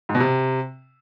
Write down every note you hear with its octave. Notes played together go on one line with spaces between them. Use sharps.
G#2
B2
C3